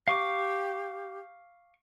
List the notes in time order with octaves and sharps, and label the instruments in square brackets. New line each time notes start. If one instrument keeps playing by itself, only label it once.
[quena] G4 [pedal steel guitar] F5 C#6 D6